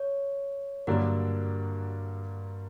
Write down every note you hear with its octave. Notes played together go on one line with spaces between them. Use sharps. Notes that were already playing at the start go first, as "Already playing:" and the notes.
Already playing: C#5
G2 D3 F#3 A#3 D4 A#4